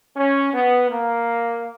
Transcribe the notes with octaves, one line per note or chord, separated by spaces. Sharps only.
C#4
B3
A#3